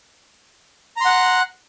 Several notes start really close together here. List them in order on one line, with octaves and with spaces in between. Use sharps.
A#5 C6 F#5 F#6